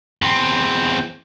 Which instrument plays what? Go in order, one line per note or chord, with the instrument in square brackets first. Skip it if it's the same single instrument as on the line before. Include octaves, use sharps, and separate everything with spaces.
[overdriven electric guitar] E2 C4